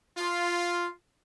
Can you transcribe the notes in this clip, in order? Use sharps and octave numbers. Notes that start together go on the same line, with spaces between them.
F4